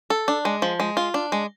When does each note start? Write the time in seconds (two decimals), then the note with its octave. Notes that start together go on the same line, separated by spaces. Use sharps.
0.10 A4
0.28 D4
0.45 G#3
0.62 F3
0.80 G#3
0.97 F4
1.14 D4
1.32 G#3